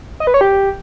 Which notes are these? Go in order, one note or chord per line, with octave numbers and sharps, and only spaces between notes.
D#5
B4
C#5
G4